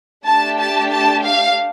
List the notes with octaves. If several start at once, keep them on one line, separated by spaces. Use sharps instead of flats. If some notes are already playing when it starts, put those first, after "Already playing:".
A3 D4 G4 A5
A5
A5
F5